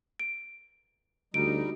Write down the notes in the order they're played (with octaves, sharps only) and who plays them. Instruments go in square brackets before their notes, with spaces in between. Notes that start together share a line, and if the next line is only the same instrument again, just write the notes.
[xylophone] D7
[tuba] D2 [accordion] G3 D#4 [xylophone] D7